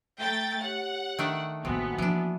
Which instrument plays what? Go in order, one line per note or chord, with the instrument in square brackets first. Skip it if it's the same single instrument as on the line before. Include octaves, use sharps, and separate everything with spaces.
[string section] A3 G5 A6 [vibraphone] A#5
[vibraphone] G4 C#5 [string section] F#5
[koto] D#3 A3 D4 [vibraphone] D#5
[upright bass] A1 D#4 [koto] C3 [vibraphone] A#3 F#4 G#5 [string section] B3
[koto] E3 D4 [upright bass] F3